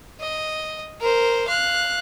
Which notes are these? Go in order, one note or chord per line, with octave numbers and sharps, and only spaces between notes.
D#5
A#4 C5
F5 F#6